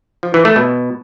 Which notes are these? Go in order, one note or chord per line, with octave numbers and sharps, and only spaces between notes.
F3
E3
A3
B2